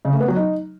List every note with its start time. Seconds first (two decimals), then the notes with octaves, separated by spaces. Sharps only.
0.05 C#3
0.12 A3
0.20 B3
0.28 F#3
0.36 D#4